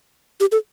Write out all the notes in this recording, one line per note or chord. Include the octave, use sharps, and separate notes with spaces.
G4
A4